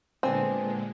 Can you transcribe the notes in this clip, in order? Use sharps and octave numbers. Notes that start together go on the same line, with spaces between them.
A#2 D3 G#3 B3 C4 D4 G#5